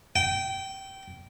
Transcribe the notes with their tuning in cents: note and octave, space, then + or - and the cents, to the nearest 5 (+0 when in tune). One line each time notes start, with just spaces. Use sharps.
G5 -20